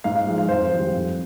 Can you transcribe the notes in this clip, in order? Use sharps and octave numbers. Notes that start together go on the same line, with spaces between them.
G#2 F5
F5
F3 G#3
F5
F2 C5
D#3 G3
F2